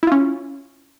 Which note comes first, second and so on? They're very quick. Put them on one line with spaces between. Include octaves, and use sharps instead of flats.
E4 F4 C#4